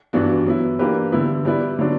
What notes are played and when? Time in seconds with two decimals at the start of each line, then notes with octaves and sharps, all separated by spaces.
0.13 G2 E3 B3 D4 F#4
0.46 F#3 B3 E4
0.79 E3 A#3 D4 G4 B4
1.12 D3 G3 B3 E4
1.45 G3 B3 E4 B4 D5
1.79 D3 F#3 B3 D4 F#4